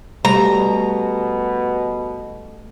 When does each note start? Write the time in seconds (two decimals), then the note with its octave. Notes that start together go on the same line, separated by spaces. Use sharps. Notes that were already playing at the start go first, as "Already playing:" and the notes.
0.25 B2 G3 A3 A#5